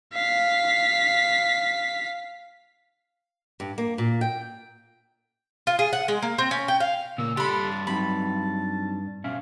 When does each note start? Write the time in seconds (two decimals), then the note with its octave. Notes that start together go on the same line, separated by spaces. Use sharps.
0.13 F5 B6
3.60 G2
3.78 A#3
3.98 A#2
4.21 G5
5.67 F4
5.79 G#4
5.93 F#5
6.08 G#3
6.22 A#3
6.38 C4
6.51 C#4
6.68 G5
6.80 F5
7.18 A#2 C#3 A#3 E6
7.37 G2 D4 G4 A4 A5 B5 C6
7.87 F#3 C4 D#4 B5
9.24 B2 C#4 E5 F5